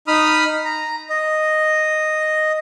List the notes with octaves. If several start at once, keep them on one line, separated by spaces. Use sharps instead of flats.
D#4 B5 D#6 F6
A#5
D#5